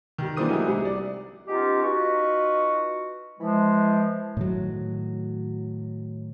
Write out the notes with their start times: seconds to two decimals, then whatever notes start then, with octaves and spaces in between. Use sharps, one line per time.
0.18 D#3 G3
0.37 E3 A#3 D4 C5 D#6 D#7
0.49 F#3 A3 D#4 E4 G4 G#4
0.68 C2 C3
0.85 D5
1.47 G#3 B3 C#4 D#4 F4 G4
1.83 D#4 F4 F#4 B4 C#6
3.39 E3 F3 G#3
4.37 A2 D#3 F#3